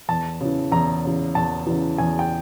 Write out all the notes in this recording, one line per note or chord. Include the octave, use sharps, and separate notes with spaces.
E2 A5
C#3 E3
E2 A#5
C#3 E3
E2 A5
C#3 E3
E2 G#5
G5